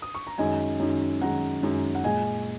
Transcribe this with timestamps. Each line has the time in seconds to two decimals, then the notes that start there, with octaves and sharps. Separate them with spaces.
0.02 D#6
0.15 C#6
0.27 A#5
0.38 F#2 D#3 G#3 D#5 G#5
0.80 F#2 D#3 G#3
1.21 F#2 D#3 G#3 F#5 A#5
1.63 F#2 D#3 G#3
1.95 F#5
2.04 A#2 G#3 D#5 G#5